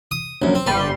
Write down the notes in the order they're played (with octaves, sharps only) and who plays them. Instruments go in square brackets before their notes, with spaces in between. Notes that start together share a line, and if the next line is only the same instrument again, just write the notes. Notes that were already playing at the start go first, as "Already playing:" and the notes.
[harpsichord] D#6
A#1 F#2
C4
[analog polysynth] G1 G3 C6 [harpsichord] B4